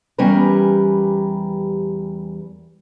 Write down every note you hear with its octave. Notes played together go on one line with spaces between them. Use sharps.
E2 G3 C#4 G4 A#4 B4